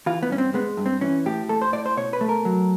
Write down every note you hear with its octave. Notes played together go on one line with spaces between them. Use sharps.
E3 F4
B3
G2 C#4
C4
G#3 B3
G2
C4
E3 C#4
A2 G4
A3 A4
C5
A2 D5
C5
B2 C#5
B4
A3
A#4
F#3